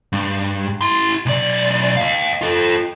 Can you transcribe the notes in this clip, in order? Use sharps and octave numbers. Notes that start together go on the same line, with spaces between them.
G2
E4 C6
B1 D5
D#5 F5
F4 A4